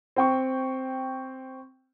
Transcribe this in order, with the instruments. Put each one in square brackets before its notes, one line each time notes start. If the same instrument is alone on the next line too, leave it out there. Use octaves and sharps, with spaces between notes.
[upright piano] C4 G5 C#6